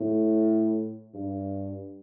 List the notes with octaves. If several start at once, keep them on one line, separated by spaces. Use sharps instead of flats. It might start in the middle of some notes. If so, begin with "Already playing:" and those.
Already playing: A2
G2